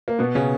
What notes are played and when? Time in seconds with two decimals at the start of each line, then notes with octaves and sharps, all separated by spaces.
0.08 A#3
0.19 B2 B3
0.35 C#3 C#4